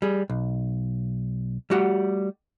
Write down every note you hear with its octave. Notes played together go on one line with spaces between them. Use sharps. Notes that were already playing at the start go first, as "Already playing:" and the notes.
G3 G#4
B1
G3 A3 F#4 G4 F#5